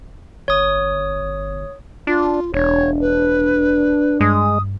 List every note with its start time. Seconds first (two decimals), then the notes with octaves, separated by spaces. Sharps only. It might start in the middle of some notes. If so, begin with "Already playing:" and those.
0.48 G1 C#5 D#6
2.07 D4 F4
2.54 E1 D4 C#5
3.01 B4
4.21 G2 G#3 D#6